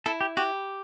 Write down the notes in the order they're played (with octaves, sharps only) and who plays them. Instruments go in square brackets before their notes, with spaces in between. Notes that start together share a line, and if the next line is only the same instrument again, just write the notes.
[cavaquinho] E4 [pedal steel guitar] A4
[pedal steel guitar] G4
[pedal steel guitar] F#4 [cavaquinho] G4